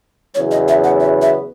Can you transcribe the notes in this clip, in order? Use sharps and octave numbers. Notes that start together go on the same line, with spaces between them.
E2 C#3 F#3 B3 C#5
D#5
E5
F#5
E5
E5